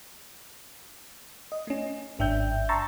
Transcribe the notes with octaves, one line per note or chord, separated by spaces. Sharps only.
D#5
A3 C#4
G#1 G2 D4 E5 G5 G6
A5 A#5 C6 C#6 E6 A6